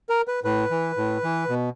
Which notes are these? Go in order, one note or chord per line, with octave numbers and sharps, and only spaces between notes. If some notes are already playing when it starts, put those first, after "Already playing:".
A#4
B4
A2 B4
E3
A2
E3
B2